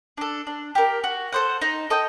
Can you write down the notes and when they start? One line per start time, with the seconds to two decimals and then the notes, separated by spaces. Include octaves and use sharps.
0.18 D4 A4
0.47 D4
0.75 G4 A#4
1.04 F#4
1.33 A4 C5 F#5
1.62 D#4
1.90 A4 D#5 G5